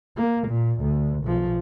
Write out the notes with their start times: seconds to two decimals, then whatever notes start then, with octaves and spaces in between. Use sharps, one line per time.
0.17 A#3
0.48 A#2
0.80 D2
1.24 B1 F3